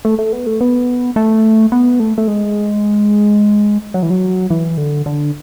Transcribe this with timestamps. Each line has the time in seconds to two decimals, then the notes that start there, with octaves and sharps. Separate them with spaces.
0.05 A3
0.19 A3
0.33 B3
0.47 A3
0.61 B3
1.16 A3
1.72 B3
2.00 A3
2.18 A3
2.28 G#3
3.94 F#3
4.03 E3
4.10 F#3
4.50 E3
4.77 D3
5.06 D3